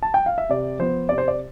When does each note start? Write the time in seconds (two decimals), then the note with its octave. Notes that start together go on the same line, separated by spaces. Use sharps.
0.03 A5
0.14 G5
0.26 F5
0.38 E5
0.49 C3 D5
0.79 F3 B3 C5
1.09 C3 D5
1.18 C5
1.28 D5